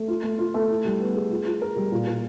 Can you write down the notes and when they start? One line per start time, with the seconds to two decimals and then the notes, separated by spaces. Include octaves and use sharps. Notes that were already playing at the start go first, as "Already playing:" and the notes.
Already playing: A3
0.08 F4
0.23 A3
0.39 F4
0.54 A3
0.70 E4
0.85 G3
1.00 B3
1.15 G#4
1.30 F4
1.46 F4
1.62 A#4
1.76 G3
1.92 A#2
2.07 A#2